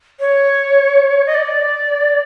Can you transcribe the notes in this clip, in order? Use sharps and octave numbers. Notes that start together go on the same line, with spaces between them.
C#5
D#5
D5